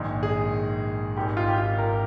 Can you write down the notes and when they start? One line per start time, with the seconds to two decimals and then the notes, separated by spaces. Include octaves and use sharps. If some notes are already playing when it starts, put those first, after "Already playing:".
Already playing: A#1 G#2 D#3
0.23 G#4
1.16 G#1 G#2 D#3 G4
1.37 F4
1.48 G4
1.58 F4
1.78 A#4